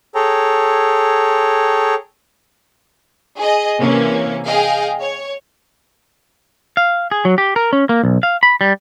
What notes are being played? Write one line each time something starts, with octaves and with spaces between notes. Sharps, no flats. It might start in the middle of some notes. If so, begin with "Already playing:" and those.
G#4 A4 C#5 G5 A#5
G#4 D#5
C3 E3 A#3 C#4
G#4 D#5 F5 G5
C#5
F5
G#4
F#3
G4
A#4
C#4
A#3
B1
F5
B5
G3